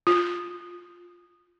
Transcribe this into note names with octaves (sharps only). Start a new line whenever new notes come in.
F4